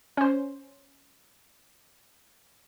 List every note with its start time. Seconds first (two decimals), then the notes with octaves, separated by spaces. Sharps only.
0.17 C#4 C5